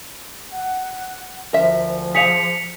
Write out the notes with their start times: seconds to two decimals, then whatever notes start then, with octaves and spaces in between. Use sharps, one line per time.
0.52 F#5
1.53 D2 F3 A#4 E5
2.15 G#4 C5 F5 B6 C#7 F7